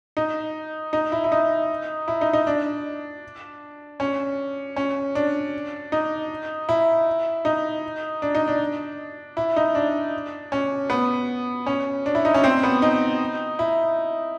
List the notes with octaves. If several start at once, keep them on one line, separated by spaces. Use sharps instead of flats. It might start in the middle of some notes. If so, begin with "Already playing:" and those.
D#4
D#4
E4
E4
D#4
E4
D#4
D#4
D4
C#4
C#4
D4
D#4
E4
D#4
D4
D#4
D4
E4
D#4
D4
C#4
B3
C#4
D4
E4
D#4
C#4
C4
B3
D#4
E4